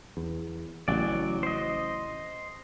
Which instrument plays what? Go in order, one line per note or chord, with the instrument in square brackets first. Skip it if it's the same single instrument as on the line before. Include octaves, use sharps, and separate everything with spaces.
[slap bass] E2
[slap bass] A1 C#3 [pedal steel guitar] F#3 D5
[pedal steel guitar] C5 D#5